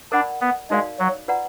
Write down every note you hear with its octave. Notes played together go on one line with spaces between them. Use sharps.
D4 A#4 D5 F#5 B5
B3
G#3 D#4 F#4 A#4 D5 F5
F#3
F4 B4 D5 F#5 A#5